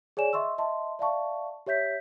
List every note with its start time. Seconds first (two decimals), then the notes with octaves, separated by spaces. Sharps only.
0.17 G#4 C#5 D5 G#5 E7
0.33 D#5 E5 C6 C#6 E6
0.58 D#5 E5 A5 C6
0.99 D5 E5 F5 A5 C#6
1.66 G4 C#5 E5 G6 B6